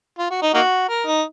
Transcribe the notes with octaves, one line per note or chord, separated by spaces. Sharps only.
F4
F#4
D#4
A#3 D#4 F#4
A#4
D#4